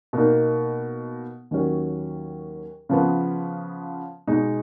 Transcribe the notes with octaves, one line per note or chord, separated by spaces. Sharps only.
B2 A#3 D#4
D#2 D#3 F#3 C#4
C#3 F3 B3
B2 G#3 D#4